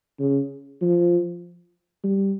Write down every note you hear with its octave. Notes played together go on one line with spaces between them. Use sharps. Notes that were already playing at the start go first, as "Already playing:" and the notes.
C#3
F3
G3